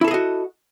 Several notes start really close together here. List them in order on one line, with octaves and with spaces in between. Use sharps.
E4 A4 G#4 D#5 F#4